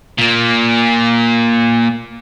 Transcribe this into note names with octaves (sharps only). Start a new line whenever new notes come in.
A#2 A#3